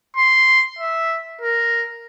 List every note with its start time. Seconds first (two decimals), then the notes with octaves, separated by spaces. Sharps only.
0.16 C6
0.79 E5
1.41 A#4